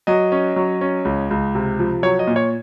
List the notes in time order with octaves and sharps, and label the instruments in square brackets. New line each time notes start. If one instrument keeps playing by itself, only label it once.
[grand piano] F#3 D#5
C#4
F#3
C#4
C#2
C#2
C3
F3
F#3 C#5
D#5
A#2
C#5